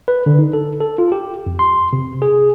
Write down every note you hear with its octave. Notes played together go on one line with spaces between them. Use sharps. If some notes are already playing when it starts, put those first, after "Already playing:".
B4
D3
D#4
A4
A4
F4
G4
F2
C6
C3
G#4